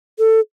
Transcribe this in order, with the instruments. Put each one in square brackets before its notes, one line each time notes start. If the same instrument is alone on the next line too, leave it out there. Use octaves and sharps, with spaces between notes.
[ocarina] A4